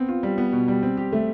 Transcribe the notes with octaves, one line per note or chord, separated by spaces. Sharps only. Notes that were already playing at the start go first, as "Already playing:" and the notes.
Already playing: B3 C4
F4
G3
B3
B2
G3
C4
G4
A3